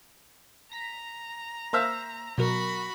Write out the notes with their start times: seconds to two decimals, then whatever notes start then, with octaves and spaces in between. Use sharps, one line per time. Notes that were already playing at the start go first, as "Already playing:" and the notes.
0.72 A#5 A#6 B6
1.73 A#3 C5 E5 F5
2.38 B2 F#3 F#4 A#4 B5